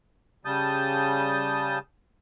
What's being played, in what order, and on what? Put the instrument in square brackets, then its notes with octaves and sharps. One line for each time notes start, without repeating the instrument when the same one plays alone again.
[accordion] C#3 G3 A5 D#6 G6